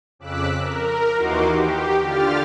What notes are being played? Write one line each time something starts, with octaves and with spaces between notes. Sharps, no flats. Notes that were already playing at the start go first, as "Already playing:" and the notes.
F2 C#3 D6 E6 F#6 B6
A#4
D#2 E3 D#4 F#4 C6 D6
G4
D3 F4 G4 F6 A6